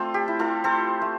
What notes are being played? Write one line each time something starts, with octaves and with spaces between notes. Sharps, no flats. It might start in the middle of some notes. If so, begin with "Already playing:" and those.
Already playing: A3 C4 F4 A4 C5 D5
G4
E4
F4 A4
C4 A4 C5
A3